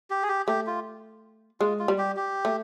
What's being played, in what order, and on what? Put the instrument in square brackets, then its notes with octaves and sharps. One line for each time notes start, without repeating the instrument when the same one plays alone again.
[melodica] G4
G#4
G4
[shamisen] A3 [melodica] G4
[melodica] F4
[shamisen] G#3 [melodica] F4
[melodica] F4
[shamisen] G3
[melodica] G4
G4
[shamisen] A3